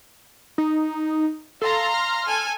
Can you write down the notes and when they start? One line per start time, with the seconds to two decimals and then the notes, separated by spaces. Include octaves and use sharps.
0.58 D#4
1.62 A4 F5 A#5 C6
1.94 F6
2.25 A4 G#5